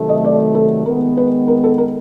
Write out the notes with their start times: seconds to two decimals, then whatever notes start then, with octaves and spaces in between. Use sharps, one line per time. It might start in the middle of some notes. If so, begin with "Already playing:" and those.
Already playing: C3 D#3 F#3 A3
0.09 D#5
0.25 D5
0.55 A4
0.85 D#3 G#3 B3 A#4
1.17 B4
1.48 A#4
1.64 A4
1.78 A#4